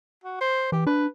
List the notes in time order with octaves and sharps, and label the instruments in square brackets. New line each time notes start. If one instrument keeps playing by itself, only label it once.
[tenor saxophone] F#4
C5
[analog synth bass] E3 [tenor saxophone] G4
[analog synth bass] D4 [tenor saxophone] B4